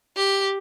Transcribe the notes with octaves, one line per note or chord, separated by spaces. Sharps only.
G4